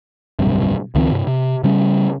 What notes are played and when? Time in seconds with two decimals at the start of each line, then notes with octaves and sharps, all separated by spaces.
0.39 D1 B1 G2 C3
0.95 C#2 D#3 F3 C4
1.11 G2 C3
1.27 C3
1.64 C#3 G3 C#4